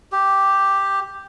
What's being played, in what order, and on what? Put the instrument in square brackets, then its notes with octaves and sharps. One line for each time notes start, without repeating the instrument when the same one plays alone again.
[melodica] G4